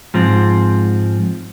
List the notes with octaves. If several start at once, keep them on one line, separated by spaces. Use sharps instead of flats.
G#2 F3 C4